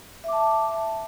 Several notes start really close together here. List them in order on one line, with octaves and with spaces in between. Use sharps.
E5 D6 A5